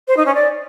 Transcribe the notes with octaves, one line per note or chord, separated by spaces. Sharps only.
C5
D#4
C#4
D5